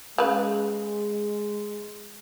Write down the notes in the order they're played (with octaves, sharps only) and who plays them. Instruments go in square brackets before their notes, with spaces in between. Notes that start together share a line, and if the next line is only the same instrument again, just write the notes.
[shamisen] C#3 B4 [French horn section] G#3